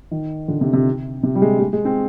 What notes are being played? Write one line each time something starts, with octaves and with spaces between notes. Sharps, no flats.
D#3
D3
C3
C3
C3
G3
G#3
G#3
G#3
C4